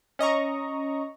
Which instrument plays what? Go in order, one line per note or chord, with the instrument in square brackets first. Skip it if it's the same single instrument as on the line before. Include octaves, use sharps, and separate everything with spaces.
[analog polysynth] C#4 D#5 A#5 C#6